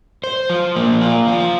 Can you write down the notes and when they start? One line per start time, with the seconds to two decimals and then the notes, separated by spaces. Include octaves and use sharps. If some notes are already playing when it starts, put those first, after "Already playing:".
0.24 C5
0.50 F3
0.76 A#3
1.01 F4
1.27 F3